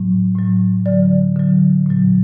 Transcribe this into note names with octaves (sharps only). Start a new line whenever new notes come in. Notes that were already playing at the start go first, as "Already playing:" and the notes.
Already playing: A2 F#3
A2 F#3
D3 F#3 D5
D3 F#3
A#2 F#3